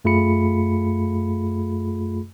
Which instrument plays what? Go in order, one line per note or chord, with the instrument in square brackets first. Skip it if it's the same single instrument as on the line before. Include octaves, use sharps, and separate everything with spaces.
[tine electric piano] F#2 A3 F4 G#4 B5 C#7